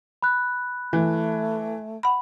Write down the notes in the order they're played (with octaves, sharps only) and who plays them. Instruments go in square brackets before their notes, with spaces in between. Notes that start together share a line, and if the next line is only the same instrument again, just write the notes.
[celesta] B5 F#6
[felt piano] E3 [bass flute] A3
[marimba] F#5 B5